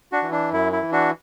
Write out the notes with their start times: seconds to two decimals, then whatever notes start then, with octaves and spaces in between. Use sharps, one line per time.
0.12 D4 F#4
0.22 E3
0.32 D4
0.52 F#2 E4
0.73 E4
0.82 E3
0.92 D4 F#4